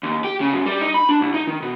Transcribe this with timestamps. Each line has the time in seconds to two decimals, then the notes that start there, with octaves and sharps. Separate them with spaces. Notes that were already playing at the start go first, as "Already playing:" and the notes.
0.03 D#2
0.24 G4
0.41 C#3
0.53 F#2
0.66 G3
0.81 D#4
0.94 B5
1.09 D4
1.21 C2
1.34 D#4
1.47 D#3
1.62 B2